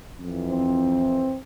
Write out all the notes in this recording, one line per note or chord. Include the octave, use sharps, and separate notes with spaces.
F2 E3
C4